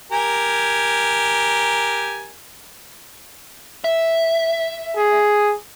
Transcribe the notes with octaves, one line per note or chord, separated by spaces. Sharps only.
G4 A#4 G#5
E5
G#4